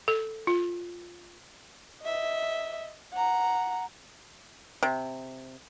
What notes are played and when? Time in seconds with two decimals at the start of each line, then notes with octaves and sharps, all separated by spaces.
0.08 A4
0.47 F4
2.02 D#5 E5
3.13 F#5 A#5
4.83 C3